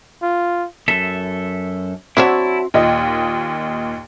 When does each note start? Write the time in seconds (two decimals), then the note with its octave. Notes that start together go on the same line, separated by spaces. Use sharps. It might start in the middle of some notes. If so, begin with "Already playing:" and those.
0.23 F4
0.88 F#2 A4 E5
2.17 F#3 C4 D4 E4 F#4 C#5 E5 A5
2.74 D#2 A#2 D#5